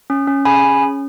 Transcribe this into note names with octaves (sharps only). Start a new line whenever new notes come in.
C#4
C#4
G#4 G#5 B5
C#4
C#4